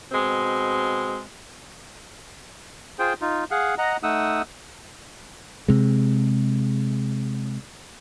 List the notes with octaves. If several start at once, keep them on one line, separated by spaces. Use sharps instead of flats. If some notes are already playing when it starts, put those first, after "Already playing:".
B2 G#3 C4
F4 G#4 C5 G5
D#4 F4
G#4 F5 F#5
D#5 F#5 A#5
A3 D#4 F#5 D#6 E6
C3 G#3